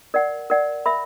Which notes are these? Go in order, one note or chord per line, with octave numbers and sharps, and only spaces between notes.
A#4 D5 F#5
A#4 D5 F#5
A#4 E5 B5